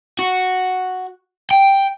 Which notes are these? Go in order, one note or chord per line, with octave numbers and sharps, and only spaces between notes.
F#4
G5